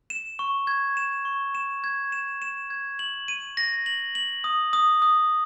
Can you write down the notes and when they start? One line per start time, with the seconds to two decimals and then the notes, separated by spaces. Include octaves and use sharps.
0.10 E7
0.39 C#6
0.67 G#6
0.97 E7
1.25 C#6
1.55 E7
1.84 G#6
2.12 E7
2.42 E7
2.70 G#6
2.99 F#7
3.28 D#7
3.57 A#6
3.86 F#7
4.15 F#7
4.44 D#6
4.73 D#6
5.02 D#6